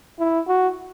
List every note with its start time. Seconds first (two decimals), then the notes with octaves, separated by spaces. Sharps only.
0.19 E4
0.48 F#4